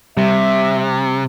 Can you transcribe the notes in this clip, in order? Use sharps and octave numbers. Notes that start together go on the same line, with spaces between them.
C3 G3 E5